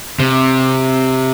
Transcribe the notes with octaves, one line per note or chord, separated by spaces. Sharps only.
C3